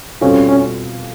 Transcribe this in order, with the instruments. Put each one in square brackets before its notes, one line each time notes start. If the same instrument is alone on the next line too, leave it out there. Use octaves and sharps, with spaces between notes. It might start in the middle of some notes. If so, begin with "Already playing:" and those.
[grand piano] B2 G3 C4 F4 A4 [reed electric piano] C#4
[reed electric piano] C#4